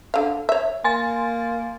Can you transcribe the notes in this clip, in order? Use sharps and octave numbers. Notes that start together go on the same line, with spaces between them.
D3 F5
C#5 E5
A#3 G#5 C6 A6